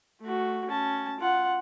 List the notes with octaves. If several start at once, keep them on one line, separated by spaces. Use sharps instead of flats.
A3 F#4
C#4 A5
F4 F#5